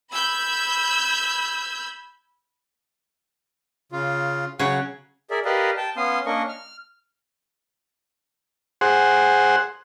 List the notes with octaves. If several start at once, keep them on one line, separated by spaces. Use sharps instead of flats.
B5 E6 G6 G#6
C#3 F4
C#3 F#3 C#5 F#5
G#4 A#4 D5 E5
G4 A#4 B4 D5 D#5 F5
G5 A5
B3 C#4 F5 C6 D#6
A#3 C#4 D4 A#4 D#5 C#6
F6
G#4 C5 F#5